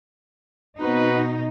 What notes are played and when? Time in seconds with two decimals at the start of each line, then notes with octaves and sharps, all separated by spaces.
0.81 B2 C4 D#4 F#4 B4